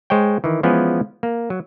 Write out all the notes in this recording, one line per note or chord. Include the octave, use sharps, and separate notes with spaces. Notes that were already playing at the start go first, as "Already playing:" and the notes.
G#3 C5 C#5 G5
D#3 E3
E3 F3 G#3 B3 C#4
A#3
F#3